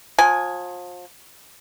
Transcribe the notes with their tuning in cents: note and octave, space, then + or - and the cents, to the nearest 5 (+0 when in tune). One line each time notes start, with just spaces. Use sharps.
F3 +35 G#5 +0